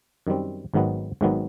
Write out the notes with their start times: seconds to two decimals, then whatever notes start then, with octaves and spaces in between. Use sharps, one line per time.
0.27 F#2 D#3 G3 C4
0.74 G#1 G#2 D#3 F#3 B3
1.21 G#1 G#2 D#3 F#3 B3